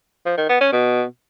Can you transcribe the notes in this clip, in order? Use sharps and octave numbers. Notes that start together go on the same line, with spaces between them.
F3
D#3
B3
C#4
B2